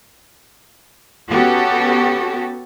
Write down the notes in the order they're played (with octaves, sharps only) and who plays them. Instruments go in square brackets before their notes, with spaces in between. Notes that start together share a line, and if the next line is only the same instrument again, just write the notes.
[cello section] B3 C#4 F#4 G4 A4